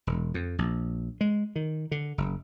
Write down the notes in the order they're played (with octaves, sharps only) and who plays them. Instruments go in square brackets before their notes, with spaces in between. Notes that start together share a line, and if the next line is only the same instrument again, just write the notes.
[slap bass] E1
F2
A#1
G#3
D#3
D3
F#1